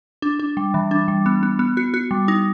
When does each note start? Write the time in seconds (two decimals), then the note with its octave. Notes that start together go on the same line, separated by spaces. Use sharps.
0.22 D4
0.39 D4
0.57 G3
0.74 E3
0.91 D4
1.08 G3
1.26 B3
1.43 B3
1.59 B3
1.77 F#4
1.94 F#4
2.11 G3
2.28 D#4